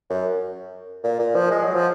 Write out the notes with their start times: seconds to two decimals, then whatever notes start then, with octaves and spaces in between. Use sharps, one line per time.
0.10 F#2
1.04 A#2
1.19 A#2
1.35 F3
1.51 G#3
1.63 F#3
1.75 F3